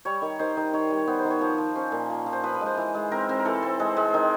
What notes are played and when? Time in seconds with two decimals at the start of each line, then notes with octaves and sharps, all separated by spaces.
0.05 G3 C#5
0.22 D#3
0.39 D#3 C5
0.57 D#3
0.73 D#3 C#5
0.90 G3
0.97 C#5
1.07 B3 C5
1.19 C5
1.25 D#3
1.30 C#5
1.41 F3 C5
1.58 F3
1.75 C#4 C5
1.92 A#2
2.10 F3
2.26 F3
2.33 C5
2.43 F3 B4
2.54 B4
2.61 G#3
2.66 C5
2.77 E3
2.94 G#3
3.12 C4 A#4
3.29 C4
3.39 A#4
3.45 E3 A4
3.63 C4
3.80 G#3
3.96 G#3
4.14 D#3